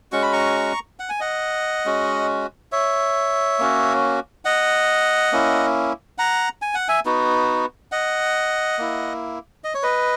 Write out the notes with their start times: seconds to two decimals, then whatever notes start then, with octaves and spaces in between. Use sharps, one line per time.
0.12 G#3 C#4 F#4 C#6
0.22 B5
0.32 A#5 C#6
0.99 F#5
1.09 G#5
1.20 D#5 F#5
1.85 G#3 C#4 F#4
2.72 C#5 E5
3.59 A#3 C#4 F#4
4.45 D#5 F#5
5.32 A#3 C#4 E4
6.18 F#5 A#5
6.62 G#5
6.74 F#5
6.88 E5 G#5
7.06 B3 D#4 F#4
7.92 D#5 F#5
8.78 A#3 E4
9.64 D#5
9.74 C#5
9.83 B4 D#5